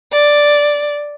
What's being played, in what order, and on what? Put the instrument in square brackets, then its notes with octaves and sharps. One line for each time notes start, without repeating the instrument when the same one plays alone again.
[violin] D5